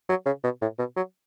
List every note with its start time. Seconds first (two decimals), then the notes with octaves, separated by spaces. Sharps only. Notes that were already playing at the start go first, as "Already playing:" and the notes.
0.09 F#3
0.26 C#3
0.44 B2
0.62 A2
0.79 B2
0.96 F#3